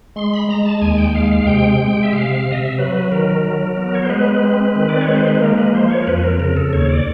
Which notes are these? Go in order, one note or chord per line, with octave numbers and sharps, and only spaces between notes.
G#3 C6
B5
G#3 A#5
A5
D#2 G#5
G5
G#3 F5
F5
C3 G5
G#3
E5
C3 F5
E5
F5
C3
D#5
E5
F#3 B4
D#3 A#4
F#3
B3
C#5
C5
G#3 B4
C4
D#3
D5
C#5
G#3
C5
B4
A#3 A#4
B4
F3 C5
C#5
A#4
F2 B4
A#4
C#3 A#4
A4
D#2 C#5
D5